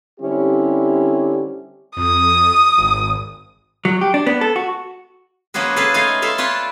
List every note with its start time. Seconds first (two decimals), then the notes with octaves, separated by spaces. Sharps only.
0.20 D3 G3 C4 C#4 E4 G4
1.97 F2 D#6
2.78 G#1
3.85 F#3
4.01 G4
4.14 D4
4.26 B3
4.41 A4
4.56 F#4
5.54 F3 A#3 C#4 F#4 G#4 B4
5.76 G#4 A4 B4 F5 A5
5.94 A3 D#4 F4 C#5 F5 G#5
6.22 A4 E5 F5 C6
6.38 F4 B4 C#5 D5 A5